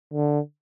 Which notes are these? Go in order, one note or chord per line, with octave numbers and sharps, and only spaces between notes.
D3